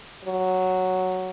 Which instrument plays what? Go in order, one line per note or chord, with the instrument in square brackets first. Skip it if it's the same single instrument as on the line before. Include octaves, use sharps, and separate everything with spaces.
[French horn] F#3